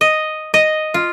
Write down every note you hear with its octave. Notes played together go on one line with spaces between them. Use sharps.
D#5
D#5
F4